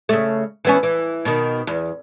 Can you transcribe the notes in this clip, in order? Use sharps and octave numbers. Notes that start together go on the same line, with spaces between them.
C#3 A3
E3 B3 C#4
E3
B2 D#3
E2